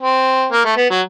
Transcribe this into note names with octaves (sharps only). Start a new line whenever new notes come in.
C4
A#3
A3
B3
F#3